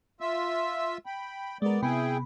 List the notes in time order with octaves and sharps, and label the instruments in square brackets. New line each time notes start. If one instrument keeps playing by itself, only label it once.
[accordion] F4 E5 E6
G5 B5
[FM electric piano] G#3 A#4 [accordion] B3 D5
[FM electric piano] C3 B3 B5 [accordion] E4 G#4 G5